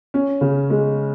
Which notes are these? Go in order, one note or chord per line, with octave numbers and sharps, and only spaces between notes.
C#4
C#3
G#3